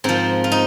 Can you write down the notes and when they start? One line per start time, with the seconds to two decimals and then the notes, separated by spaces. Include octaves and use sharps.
0.04 G#2 F3 C4
0.44 F4
0.52 D#4